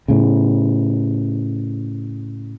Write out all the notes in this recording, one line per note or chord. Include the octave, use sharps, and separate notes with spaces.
A2 C#3